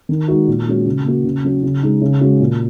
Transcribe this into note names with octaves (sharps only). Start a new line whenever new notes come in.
D#3
G#3 D#4 F#4
A#2
G#3 C#4 F#4
C#3
A#3 F#4
C#3
F#3 C#4 F#4
C#3
G#3 D#4
C#3
G#3 C#4 F#4
A#2